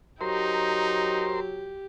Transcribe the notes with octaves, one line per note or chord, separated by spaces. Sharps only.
F#3 D#4 G4 A#4 C5 C6